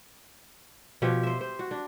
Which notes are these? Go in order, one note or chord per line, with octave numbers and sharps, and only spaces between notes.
B2 F3 G4 C#5
C5 E5
C5
F#4
D4